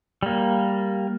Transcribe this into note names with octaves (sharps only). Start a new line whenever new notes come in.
G3 A#3